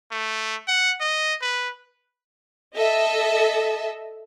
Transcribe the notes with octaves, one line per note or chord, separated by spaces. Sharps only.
A3
F#5
D#5
B4
A4 D#5 E5